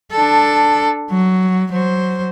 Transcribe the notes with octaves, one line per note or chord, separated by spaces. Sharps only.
D4 A4
F#3
F#3 C5